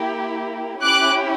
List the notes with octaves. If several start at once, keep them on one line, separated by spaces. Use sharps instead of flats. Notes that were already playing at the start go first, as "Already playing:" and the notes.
Already playing: A#3 E4 G4
C#4 E4 G4 D6 F#6